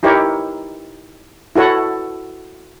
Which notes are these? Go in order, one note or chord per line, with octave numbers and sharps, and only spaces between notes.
D#4 E4 G4 A#4 C#5
E4 F#4 A4 C#5 F#5